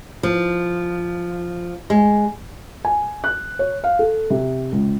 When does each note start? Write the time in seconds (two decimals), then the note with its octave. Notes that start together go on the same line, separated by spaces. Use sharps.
0.23 F3
1.90 G#3
2.85 G#5
3.24 F#6
3.59 C#5
3.84 F5
3.99 A4
4.30 C3
4.72 C#2